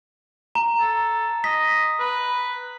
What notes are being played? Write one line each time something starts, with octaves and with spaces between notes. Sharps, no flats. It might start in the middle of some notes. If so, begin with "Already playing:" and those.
A#5
A4
D#5 B6
B4